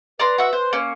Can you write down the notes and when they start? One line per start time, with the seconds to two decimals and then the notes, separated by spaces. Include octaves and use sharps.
0.20 B4 D5 A#5 C6
0.38 F#4 E5
0.53 C5
0.73 A#3 C#4